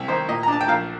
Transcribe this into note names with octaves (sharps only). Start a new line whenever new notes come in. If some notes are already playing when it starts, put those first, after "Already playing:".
Already playing: C2
D#3 C5
A#2 D#5
A#5
D4 A5
G5
A#1 F5